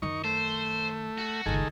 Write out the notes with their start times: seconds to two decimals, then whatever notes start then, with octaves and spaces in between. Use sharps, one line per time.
0.02 F#2 D#3 D#4 C#6
0.24 A3 C5
1.18 F#4
1.46 G1 C#2 D#3 G#4 A4